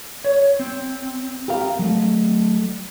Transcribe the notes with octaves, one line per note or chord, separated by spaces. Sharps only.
C#5
C4
G4 A#4 F5
F#3 A3